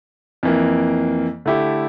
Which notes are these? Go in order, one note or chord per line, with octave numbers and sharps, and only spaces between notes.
F2 E3 A#3
D3 A3 E4 G4